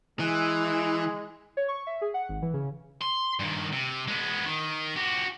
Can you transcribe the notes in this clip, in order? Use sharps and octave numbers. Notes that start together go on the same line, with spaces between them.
E3 G#3
C#5
C#6
E5
G#4
F#5
G#1
E3
C#3
C6
G2 D#3
C3
G#3 B3
D#3
F#4 G4